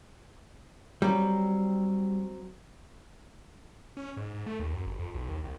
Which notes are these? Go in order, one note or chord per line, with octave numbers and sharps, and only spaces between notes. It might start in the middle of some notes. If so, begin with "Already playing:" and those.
F#3 G3 C4
C#4
G#2
G#2
A3
D#2
F#2
G1
F2
B1
D#2
C2